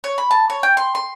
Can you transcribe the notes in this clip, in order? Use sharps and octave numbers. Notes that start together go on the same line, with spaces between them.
C#5
B5
A5
C#5
G5
C6
C6